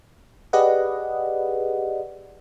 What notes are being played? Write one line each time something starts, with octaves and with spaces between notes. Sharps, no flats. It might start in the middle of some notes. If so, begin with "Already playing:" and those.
G4 G#4 B4 D5 D#5 F#5